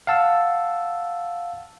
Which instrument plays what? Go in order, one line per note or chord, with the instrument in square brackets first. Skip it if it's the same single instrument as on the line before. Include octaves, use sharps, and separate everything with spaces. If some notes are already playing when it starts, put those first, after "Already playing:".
[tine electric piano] F5 F#5 A5 E6